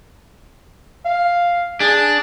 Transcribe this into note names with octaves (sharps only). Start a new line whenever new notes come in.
F5
D4 G#4